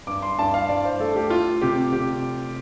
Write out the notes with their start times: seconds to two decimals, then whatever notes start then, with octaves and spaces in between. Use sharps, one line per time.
0.07 G2 D6
0.23 C6
0.39 G2 A5
0.54 F5
0.69 G2 D5
0.84 C5
1.00 A3 A4
1.16 G4
1.30 A3 F4
1.61 C3 G4
1.93 C3 G4